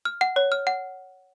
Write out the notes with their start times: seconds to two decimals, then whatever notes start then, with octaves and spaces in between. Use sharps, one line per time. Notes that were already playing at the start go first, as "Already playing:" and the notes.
0.05 F6
0.21 F#5
0.36 C#5
0.52 F6
0.67 F#5